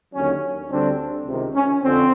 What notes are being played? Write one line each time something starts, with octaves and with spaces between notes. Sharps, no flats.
D#2 D3 F#3 C#4
D2 D3 G3 C4 D4
C#2 C3 D#3
C#4
F2 D3 C4